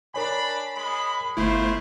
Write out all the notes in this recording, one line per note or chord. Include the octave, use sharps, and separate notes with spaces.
D4 A#4 C#5 G#5 B5
G#3 B5
G1 A3 E4 F4 C5